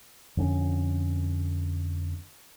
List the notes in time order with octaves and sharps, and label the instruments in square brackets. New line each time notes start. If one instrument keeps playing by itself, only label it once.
[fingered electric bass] F2 D3 C#4